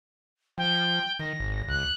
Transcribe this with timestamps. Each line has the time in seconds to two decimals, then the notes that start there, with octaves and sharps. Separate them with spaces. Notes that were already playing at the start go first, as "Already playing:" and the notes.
0.58 F3 G5
1.20 D#3 A#6
1.40 G#1
1.68 C#2 F#6